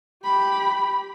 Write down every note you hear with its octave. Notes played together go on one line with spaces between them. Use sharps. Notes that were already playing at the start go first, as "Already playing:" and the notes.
G4 B5